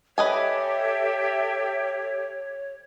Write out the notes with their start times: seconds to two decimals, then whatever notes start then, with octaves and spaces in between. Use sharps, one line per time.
0.18 G4 A4 B4 C#5 D#5 E5 G#5